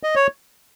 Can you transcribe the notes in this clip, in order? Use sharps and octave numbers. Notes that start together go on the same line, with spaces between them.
D#5
C#5